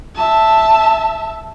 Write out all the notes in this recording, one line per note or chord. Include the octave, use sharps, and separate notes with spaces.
E5 A5